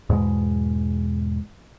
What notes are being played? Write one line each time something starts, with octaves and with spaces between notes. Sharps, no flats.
E2 G#2 B2 G#3